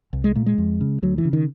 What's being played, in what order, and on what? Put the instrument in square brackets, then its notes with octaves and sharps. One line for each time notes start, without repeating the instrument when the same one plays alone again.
[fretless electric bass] C2
G#3
A#2 A3
G#3
F2
C#3
D2 F#3
E3
C#3
D#3